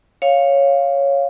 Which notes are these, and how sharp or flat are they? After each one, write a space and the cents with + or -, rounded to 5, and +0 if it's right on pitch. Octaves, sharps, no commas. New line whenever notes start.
C#5 +0 F5 +0